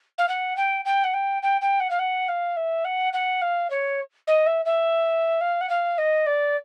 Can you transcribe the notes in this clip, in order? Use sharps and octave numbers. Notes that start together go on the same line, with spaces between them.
F5
F#5
G5
G5
F#5
G5
G5
G5
F#5
F5
F#5
F5
E5
F#5
F#5
F5
C#5
D#5
E5
E5
F5
F#5
F5
D#5
D5